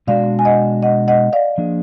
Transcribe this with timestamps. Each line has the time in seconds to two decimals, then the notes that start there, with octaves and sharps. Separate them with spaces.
0.07 B2 G#3 D4 F#4 D5 F5
0.39 G#5
0.45 D#5 F#5
0.83 D#5 F#5
1.08 D#5 F#5
1.33 D5 F5
1.58 F3 A#3 D4 G#4